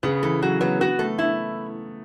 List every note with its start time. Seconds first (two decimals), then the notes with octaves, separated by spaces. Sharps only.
0.03 C#3 B3
0.23 E3 A4
0.42 F#3 F#4
0.61 F#3 B3
0.80 B3 F#4
0.99 A3 A4
1.18 A3 E4